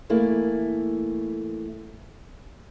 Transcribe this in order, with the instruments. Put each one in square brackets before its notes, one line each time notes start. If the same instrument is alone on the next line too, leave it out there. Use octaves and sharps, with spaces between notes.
[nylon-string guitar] E3 A3 A#3 E4